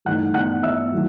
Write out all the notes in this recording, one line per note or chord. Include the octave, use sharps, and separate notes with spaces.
G2 E3 A3 D#4 F#5 F#6
F#5 F#6
E5 E6
D#3 F#3 A3 E4